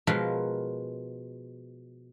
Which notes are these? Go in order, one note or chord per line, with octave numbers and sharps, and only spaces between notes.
B2 F3 G#3 F4 A#4 B4